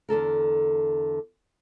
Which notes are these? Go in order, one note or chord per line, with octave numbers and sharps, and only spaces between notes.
E2 D3 A4 A#4